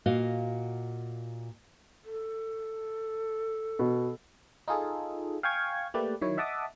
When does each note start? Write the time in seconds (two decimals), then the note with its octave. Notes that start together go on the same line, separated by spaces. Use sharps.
0.06 A#2 F#4 D#5 F5
2.05 A4
3.79 B2
4.68 D#4 F4 G#4 A4
5.43 F5 G5 G#5 C#6 G#6
5.94 A3 A#3 G4 B4 D5
6.21 D#3 F#3 E4 C#5
6.37 D#5 E5 F#5 A5 D6 D#6